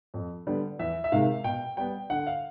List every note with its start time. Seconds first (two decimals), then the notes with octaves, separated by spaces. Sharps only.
0.14 F2
0.47 D3 G3 B3
0.79 E2 E5
1.04 E5
1.12 C3 D#3 G#3 F5
1.44 B2 G5
1.77 G3 B3 G5
2.10 D3 F#5
2.27 F5